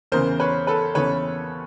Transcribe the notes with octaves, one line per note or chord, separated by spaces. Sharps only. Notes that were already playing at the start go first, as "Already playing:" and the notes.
E2 C#3 E3 A#4 C5
B4 C#5
A4 B4
E2 C#3 E3 B4 C#5